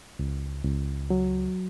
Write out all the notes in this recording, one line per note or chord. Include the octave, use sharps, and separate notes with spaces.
C#2
C#2
F#3